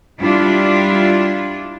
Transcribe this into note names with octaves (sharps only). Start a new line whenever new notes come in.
G3 D4 E4 F4